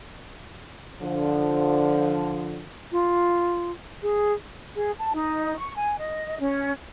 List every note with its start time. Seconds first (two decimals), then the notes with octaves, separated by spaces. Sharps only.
1.01 D3 F3
2.92 F4
4.03 G#4
4.75 G#4
4.99 A5
5.14 D#4
5.58 C#6
5.76 G#5
5.98 D#5
6.40 C#4